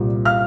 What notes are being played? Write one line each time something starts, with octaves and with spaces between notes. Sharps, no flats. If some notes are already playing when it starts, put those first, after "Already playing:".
Already playing: C2 A#2 G3
F5 F6